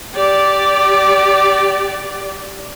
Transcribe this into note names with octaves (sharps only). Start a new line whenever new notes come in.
G4 D5